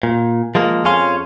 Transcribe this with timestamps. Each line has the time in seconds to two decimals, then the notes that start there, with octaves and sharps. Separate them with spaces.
0.03 A#2
0.55 F3 G#3 A#3
0.85 F2 C#4 G#4 F5 C6